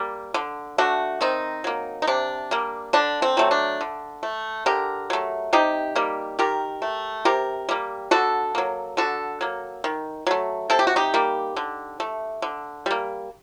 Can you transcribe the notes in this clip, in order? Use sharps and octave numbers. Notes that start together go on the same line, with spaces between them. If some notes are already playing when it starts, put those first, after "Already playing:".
Already playing: G3 A#3
D3
A3 D4 F#4
D#3 C4 D#4
F#3 A#3
D#4
C3 D4
G3 A#3
D3 D4
C4
F#3 A3
D4
D3
A3
D3 G4 A#4
F#3 A3
C3 D#4 G4
G3 A#3
D#3 G4 A#4
A3
C3 G4 A#4
G3 A#3
D3 F#4 A4
F#3 A#3
D3 F#4 A4
F#3 A#3
D#3
F#3 A3
C3 A4
G4
F#4
D#4 G4
G3 A#3
D3
A3
D3
G3 A#3